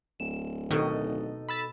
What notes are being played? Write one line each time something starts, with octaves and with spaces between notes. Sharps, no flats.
D1 E7
B2 D#3 D#4 A4 D#5
B5 E6 A6